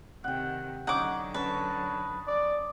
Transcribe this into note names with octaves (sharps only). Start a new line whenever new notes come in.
C3 D#3 F#5 G5
D3 F#3 C#4 D#4 F#5 D6
C#4 B4 A5
D5